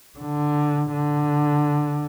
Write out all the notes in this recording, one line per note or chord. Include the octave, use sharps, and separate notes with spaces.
D3
D3